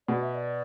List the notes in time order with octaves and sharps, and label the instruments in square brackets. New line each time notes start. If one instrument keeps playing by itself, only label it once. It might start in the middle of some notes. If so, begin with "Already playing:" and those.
[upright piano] B2 [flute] D5
[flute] E5
D5